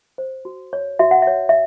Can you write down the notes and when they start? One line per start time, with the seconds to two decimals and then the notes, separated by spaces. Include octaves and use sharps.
0.18 C5
0.45 F#4
0.73 C#5
0.99 F#4 E5
1.11 F#5
1.22 C#5 E5
1.49 E5